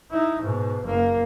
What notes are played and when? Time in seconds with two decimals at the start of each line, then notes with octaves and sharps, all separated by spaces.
0.11 D#4 E4
0.42 G#2 B2
0.83 F#1 A#3